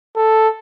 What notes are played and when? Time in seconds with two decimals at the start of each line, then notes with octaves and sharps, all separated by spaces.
0.16 A4